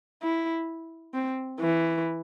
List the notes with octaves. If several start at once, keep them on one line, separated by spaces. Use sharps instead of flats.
E4
C4
E3